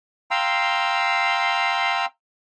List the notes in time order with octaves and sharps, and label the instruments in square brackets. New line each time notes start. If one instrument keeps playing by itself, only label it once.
[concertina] F5 G5 A#5 C6 E6